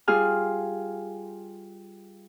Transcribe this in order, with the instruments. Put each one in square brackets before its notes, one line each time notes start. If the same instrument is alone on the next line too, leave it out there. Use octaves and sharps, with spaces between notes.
[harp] G3 F4 G#4 G#5 F6